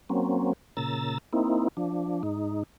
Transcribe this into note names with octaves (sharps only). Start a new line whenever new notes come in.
F#3 A#3 C4 C#4
A#2 C#3 A#5 E6 A6
A#3 C4 D#4 E4
F3 D4
G#2 D#4